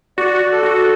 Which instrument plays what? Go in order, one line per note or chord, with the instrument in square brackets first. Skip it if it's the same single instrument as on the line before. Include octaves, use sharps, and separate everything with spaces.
[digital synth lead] F#4 [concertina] D5
[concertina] A4
[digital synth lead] F#4